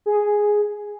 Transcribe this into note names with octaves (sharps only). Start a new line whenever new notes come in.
G#4